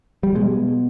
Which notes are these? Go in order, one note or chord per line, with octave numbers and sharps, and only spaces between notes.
G3
B2 G#3